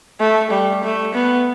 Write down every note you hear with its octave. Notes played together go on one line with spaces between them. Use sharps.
A3
G3
A3
B3